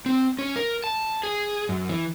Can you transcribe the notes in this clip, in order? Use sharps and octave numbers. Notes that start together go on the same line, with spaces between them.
C4
C#4
A#4
A5
G#4
F#2
E3